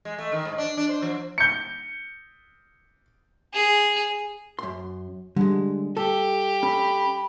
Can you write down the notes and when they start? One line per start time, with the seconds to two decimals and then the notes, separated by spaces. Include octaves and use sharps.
0.05 G#3
0.18 A3
0.32 D#3
0.45 G#2
0.58 D4
0.77 D4
0.89 C5
1.02 F3
1.38 G6 C#7
3.53 G#4
4.59 F#2 C6
5.36 D3 G3 G#3
5.97 G4 A4
6.63 C#4 A4 B5